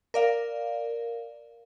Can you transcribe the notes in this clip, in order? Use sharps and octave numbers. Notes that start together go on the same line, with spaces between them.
A#4 D5 F5